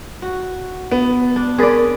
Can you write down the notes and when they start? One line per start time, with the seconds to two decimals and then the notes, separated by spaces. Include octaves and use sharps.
0.22 F#4
0.91 B3
1.36 D4
1.58 C4 G#4 A#4 D5 A6